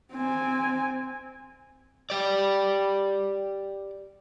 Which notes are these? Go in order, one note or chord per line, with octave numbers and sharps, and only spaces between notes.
C4 G#5
G4 D5